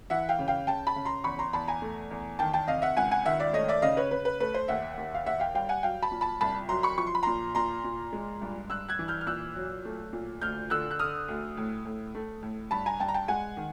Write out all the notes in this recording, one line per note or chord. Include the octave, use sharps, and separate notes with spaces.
E3 E5 F#5
F5 G5
C#3
F5 G5
C#3 G5 A5
A5 B5
C#3
A#5 C6
E2 B5 C#6
A#5 C6
E2 A5 B5
G#5 A#5
A3
E2
D#3 G5 A5
G5 A5
C3 D#5 F5
E5 F#5
C#2 F#5 G#5
F#5 G#5
D#3 E5 F#5
D5 E5
A3 C#5 D#5
D5 E5
C#3 D#5 F5
B4 C#5
C#3 B4
B4
A3 B4
C5
D#2 E5 F#5
D#2
F5
D#2 E5 F#5
F5 G5
G3 F5 G5
F#5 G#5
F#3 F5 G5
A5 B5
A#2
A5 B5
C2 A5 B5
F#3 A#5 C6
B5 C#6
F3 C#6
C6
B5
A#2 A#5 C6
A#2 A#5 C6
A#2
G#3
G2
G2 E6 F#6
F#6 G#6
E3
F6 G6
F6
A#2 E6 F#6
F#3
A3
A#2
D2 F6 G6
D3 E6 F#6
F#6
D3 D#6 F6
D2
A2
A2
A3
A2
G2 A5 B5
G#5 A#5
G2 G5 A5
A#5
G5 A5
G#3 F#5 G#5
D#3